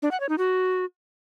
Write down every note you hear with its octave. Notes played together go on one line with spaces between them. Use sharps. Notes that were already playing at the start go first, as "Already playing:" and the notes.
D4
F#5
C#5
D#4
F#4